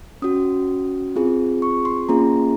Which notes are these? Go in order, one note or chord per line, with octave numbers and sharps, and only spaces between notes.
C#4 F#4 D#6
C4 F4 G#4
C#6
C6
A#3 C#4 F4 G#4 A#5